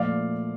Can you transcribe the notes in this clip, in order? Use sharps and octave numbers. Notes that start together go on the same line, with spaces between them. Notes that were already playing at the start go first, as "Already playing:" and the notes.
Already playing: A#2 F3 A3 D5 F5